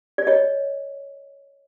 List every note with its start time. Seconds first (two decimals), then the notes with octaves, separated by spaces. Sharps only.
0.18 D5
0.27 C#5 D#5